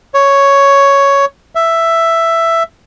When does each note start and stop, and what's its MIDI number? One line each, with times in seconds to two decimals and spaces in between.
0.14 1.25 73
1.55 2.63 76